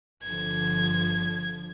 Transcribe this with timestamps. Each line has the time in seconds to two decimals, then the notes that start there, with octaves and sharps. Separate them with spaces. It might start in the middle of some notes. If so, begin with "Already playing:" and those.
0.23 G1 D3 F3 G#6